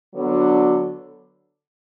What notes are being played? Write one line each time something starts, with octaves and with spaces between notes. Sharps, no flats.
D3 F#3 B3 D4